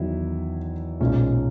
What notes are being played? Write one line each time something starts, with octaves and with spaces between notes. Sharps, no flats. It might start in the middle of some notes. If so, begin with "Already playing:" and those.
Already playing: E2 D#3 F#3 E4
B1 A#2 G#3 C#4